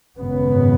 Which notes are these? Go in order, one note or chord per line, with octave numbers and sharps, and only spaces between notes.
G#1 F#2 C#3 B3